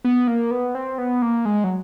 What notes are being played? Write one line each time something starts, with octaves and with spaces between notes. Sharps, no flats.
B3
A#3
B3
C4
B3
A#3
G#3
F#3